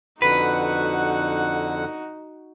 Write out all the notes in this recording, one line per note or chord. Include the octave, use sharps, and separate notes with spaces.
F2 D3 D#4 F#4 B4 F#5